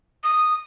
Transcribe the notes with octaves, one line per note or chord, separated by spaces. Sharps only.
D#6